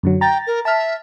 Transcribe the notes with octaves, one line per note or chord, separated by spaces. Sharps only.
F#2 D3 F#3
G5 A#5 A6
A#4
E5 A5 F6